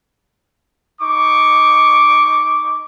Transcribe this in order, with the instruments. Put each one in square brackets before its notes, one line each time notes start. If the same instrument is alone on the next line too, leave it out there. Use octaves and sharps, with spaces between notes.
[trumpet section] D#4 C#6 D6